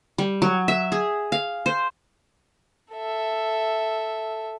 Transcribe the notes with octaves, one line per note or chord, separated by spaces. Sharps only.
G3
F#3
E5
G#4
F5
C5
A4 E5